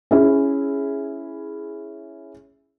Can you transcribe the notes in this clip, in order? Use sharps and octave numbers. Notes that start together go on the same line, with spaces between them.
C#4 E4 G#4